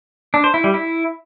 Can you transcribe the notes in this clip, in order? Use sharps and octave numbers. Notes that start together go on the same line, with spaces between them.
D4
C5
E4
G3
E4